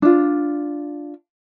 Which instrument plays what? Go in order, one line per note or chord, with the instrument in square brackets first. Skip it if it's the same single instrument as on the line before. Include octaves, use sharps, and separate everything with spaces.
[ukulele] D4 F4